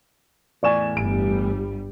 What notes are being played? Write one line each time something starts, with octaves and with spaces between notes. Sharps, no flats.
E2 A2 D5 G#5 C#6 E7
G1 G3 D7